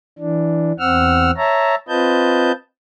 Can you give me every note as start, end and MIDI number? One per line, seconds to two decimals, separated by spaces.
0.18 0.72 52
0.18 0.72 62
0.79 1.31 40
0.79 1.31 60
0.79 1.31 78
0.79 1.31 88
0.79 1.31 89
1.37 1.75 73
1.37 1.75 76
1.37 1.75 81
1.37 1.75 82
1.88 2.52 60
1.88 2.52 65
1.88 2.52 71
1.88 2.52 75
1.88 2.52 81
1.88 2.52 91